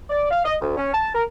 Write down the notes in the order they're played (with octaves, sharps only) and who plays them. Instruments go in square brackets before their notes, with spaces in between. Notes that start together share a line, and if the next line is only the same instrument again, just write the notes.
[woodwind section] D5
F5
D#5
D2
C#4
A5
A#4